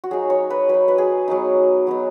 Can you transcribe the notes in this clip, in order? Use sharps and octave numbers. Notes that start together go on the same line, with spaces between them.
F#4
F#3 D#4 G#4
C#5
B4
F#3 D#4 B4
B4
G#4
F#3 B3 D#4
F#3 B3 D#4